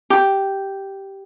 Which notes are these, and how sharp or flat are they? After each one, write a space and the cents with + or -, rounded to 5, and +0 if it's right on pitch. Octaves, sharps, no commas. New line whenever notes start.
G4 -5